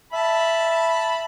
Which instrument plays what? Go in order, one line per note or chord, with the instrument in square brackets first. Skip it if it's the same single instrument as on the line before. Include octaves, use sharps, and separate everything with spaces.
[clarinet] E5 [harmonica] A5 B5